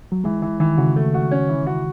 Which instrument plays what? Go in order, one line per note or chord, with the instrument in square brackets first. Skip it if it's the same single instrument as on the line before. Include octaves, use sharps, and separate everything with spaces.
[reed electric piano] F#3
[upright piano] E3 [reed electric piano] G#3
[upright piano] E3
[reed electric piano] D#3 [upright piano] E3
[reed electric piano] C#3 [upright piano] F#4
[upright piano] A3
F#4
C#4
E3
F#4